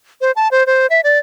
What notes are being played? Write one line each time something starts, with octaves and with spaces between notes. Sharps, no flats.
C5
A5
C5
C5
E5
D5